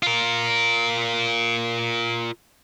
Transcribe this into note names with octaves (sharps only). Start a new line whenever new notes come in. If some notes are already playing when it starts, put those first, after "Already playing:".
F4 A#4